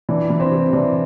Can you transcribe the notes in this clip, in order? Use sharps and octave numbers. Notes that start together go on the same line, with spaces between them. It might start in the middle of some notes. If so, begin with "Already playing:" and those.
E3 D4
E3
C4
C3
E3 D4